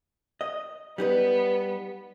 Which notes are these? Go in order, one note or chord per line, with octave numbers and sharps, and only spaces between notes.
D#5
G3 B3 D#4 B4